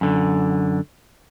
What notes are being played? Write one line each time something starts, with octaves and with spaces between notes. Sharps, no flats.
F#2 D3